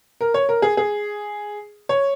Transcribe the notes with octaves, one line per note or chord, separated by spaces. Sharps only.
A#4
C#5
A#4
G#4
G#4
C#5